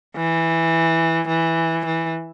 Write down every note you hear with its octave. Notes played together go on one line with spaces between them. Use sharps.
E3
E3
E3